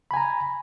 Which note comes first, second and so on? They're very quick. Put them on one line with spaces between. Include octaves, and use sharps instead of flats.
B5 G#5 A#5